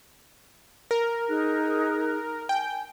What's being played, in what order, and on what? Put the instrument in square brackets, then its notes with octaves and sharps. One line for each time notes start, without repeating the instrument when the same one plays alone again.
[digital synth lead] A#4
[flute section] D#4 G#4 F#6
[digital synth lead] G5 [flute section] G#5